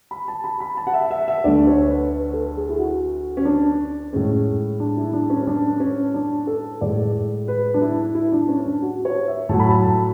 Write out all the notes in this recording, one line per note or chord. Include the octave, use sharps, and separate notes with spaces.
B5
A5
B5
B5
A5
F#5
E5
E5
E5
D2 D3 A3 D5
C#5
B4
B4
A4
G#4
E4
F#4
C#4
D4
A2 G#3 C#4
D4
E4
D4
C#4
C#4
D4
C#4
D4
A4
A2 G#3 D5
B4
D4
E4
E4
D4
C#4
D4
F#4
C#5
E5
A2 F#3 A3 A5
B5
A5